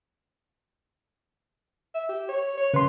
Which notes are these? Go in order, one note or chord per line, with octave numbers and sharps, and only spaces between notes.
E5
G4
C#5
C#5
C#3 B4 C6